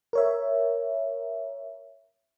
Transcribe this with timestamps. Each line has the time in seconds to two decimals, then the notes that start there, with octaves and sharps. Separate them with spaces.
0.13 A#4 C#5 E5